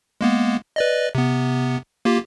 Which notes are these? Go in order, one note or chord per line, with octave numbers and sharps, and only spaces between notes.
G#3 A#3 B3
B4 D5 D#5
C3 B3
A#3 F4 G4